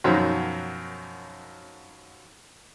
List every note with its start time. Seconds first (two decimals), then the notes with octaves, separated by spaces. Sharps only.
0.04 F#2 B2 D#3 F3 F#3